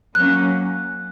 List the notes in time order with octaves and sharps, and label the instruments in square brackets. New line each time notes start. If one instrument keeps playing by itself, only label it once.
[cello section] F#3 A#3 C#4 [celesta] F#6